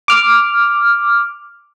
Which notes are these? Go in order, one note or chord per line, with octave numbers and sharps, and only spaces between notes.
D6 F6